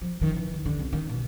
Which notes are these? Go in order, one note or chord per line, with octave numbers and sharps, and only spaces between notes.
F3
D#3
E3
D#2
D3
C2
D#3
B2